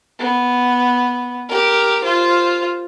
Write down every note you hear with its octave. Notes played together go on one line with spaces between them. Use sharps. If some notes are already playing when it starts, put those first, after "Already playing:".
B3
G4 A#4
F4 C5